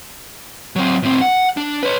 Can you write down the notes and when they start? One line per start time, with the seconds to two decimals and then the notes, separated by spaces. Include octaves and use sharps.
0.76 F#3 C4
1.03 A2 C4
1.21 F#5
1.57 D4
1.83 B4 C#5